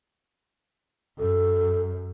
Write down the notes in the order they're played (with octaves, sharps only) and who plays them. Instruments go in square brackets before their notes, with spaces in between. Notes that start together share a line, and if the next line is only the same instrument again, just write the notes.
[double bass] F#2 [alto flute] A4